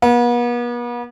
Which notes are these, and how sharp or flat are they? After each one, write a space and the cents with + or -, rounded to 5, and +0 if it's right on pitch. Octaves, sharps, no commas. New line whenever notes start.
B3 -40